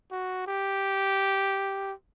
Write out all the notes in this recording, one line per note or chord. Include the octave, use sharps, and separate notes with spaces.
F#4
G4